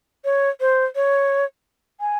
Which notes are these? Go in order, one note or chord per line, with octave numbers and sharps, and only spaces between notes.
C#5
C5
C#5
G#5